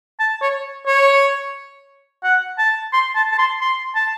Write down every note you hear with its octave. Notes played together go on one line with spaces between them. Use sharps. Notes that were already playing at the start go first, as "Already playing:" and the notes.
A5
C#5
C#5
F#5
A5
C6
A5
A5
C6
C6
A5